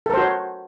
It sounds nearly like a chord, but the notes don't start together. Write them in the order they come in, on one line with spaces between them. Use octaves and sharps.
A4 A#4 C5 F#4 C#5